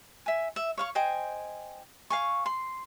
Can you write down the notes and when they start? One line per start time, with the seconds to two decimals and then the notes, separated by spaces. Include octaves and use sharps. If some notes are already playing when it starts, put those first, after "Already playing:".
0.26 E5 G#5
0.56 E5
0.78 C#5 F5 C#6
0.95 C5 D#5 G5 G#5
2.10 F5 G#5 C#6
2.46 C6